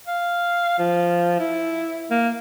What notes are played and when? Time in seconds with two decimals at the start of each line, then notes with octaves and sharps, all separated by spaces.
0.07 F5
0.79 F3
1.40 E4
2.11 A#3